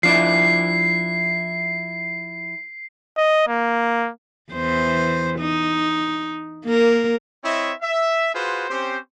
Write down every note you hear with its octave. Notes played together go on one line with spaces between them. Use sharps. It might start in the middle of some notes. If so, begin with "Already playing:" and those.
F3 D4 E4 C7
D#5
A#3
E2 E3 C5
D#4
A#3 A#4
C4 E4 C#5 D#5 E5
E5
F4 F#4 G#4 B4 C5
C4 C#4 G4 C5